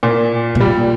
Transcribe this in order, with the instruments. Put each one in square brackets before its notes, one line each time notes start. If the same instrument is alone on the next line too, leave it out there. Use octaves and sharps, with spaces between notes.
[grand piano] A#2
[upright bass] B2
[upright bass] A#2 [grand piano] G3